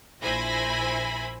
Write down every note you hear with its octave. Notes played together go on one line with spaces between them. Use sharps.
A#1 E4 C5 G#5 B5 A#6